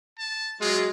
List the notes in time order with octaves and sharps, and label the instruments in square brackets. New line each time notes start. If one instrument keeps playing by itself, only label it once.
[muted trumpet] A5
[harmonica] F#3 G#3 [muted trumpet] F4